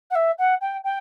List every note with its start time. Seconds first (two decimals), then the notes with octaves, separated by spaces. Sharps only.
0.11 F#5
0.15 E5
0.38 F#5
0.61 G5
0.84 G5